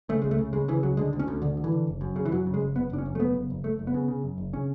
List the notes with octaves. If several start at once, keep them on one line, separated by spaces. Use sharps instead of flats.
C#3 A3
C#2 G#3
A3
C#3
C#3 G#3
C#3 E3
C#2 F#3
D3 G#3
D2
C#4
D2
D2 D3
D3
E3
D3
F#1
F#2
C#3
E3
F#2 F#3
C#3
G#3
F#1
F#1 B3
F#1 D4
C#4
F#2
A3
F#1 B3
F#1
F#1
F#1 A3
F#1
B3
C#3
C#3
F#2
F#1
C#3 C#4